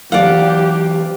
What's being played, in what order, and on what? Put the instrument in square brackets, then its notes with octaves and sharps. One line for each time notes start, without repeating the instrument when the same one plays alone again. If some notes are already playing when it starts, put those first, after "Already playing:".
[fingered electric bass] E3 F#3 [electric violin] G4 [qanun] D5 F#5 [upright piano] F5